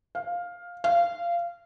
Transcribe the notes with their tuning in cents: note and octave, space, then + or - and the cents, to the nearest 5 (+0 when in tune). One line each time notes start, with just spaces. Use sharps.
F5 +10
F5 -20